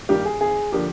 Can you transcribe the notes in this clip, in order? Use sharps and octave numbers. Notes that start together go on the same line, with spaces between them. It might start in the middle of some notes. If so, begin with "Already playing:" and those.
G2 D#3 G3 A#3 G4
G#4
G#1 G#4
D3 F3 A#3 G4